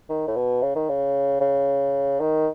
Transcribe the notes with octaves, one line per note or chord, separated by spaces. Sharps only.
D#3
A2
B2
C#3
D#3
C#3
C#3
D#3